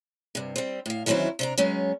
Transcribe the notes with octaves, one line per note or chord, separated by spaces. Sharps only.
G2 C3
G3 C4
A2 F5
D#3 E3 F#3 C4 C#4 E4
C3 D4 A#5
F#3 G#3 B3 C#4